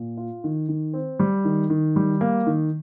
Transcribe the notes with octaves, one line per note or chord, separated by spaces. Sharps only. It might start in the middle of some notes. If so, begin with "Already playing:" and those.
Already playing: A#2
F4
D#3
D#3
C4
G3
D#3
D#3
G3
A#3
D#3